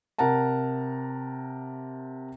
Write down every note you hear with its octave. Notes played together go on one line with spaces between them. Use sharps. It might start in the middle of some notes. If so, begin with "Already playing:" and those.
C3 A#4 F#5 A5 A#5